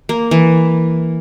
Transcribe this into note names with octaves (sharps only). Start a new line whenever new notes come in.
A#3
E3